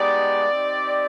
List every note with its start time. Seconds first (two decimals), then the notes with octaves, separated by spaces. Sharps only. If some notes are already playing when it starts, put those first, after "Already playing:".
Already playing: G#3 B3 D#4 G4 D5
0.52 C4 D#4 G4